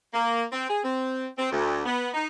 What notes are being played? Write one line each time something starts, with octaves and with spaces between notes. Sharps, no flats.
A#3
C4
G#4
C4
C4
D2
B3
D#4